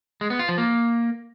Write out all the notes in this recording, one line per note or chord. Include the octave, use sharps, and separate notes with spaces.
G#3
B3
F4
F3
A#3